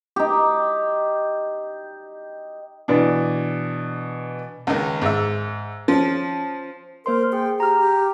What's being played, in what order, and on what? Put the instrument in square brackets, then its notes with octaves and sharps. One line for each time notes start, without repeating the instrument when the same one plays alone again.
[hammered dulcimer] D#4 G4
[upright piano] B2 E3 D4
[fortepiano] C#2 D#3
G#2 E5
F3 C#4
[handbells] A#3 C5 C6 [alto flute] A#4
[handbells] G#4 [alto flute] G5
[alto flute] G4 [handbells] A#5 F6
[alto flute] G4